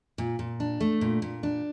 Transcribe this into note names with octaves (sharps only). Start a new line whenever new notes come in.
A#2
A#2
D4
A3
A#2
A#2
D4